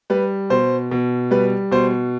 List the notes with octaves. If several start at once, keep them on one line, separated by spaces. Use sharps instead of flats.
G3 B4
B2 C5
B2
G3 B4
B2 C5